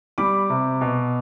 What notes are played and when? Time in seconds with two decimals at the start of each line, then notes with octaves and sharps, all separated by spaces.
0.18 G3 B5 D6
0.50 C3
0.81 B2